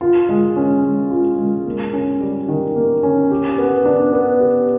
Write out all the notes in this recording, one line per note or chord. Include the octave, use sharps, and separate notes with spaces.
F4
G#3
C#4
G#3
F4
G#3
A#3
C#4
G3
D#3
A#3
C#4
G4
B3
D4
B3
G4